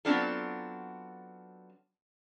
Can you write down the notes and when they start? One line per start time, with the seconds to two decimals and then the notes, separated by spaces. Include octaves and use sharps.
0.05 F#3 B3 C4 D4 F4 A4